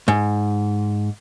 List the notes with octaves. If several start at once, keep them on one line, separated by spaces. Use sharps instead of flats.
G#2